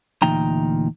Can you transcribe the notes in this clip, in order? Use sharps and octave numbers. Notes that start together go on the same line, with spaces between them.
D2 A#2 E3 D#4 G5 A#5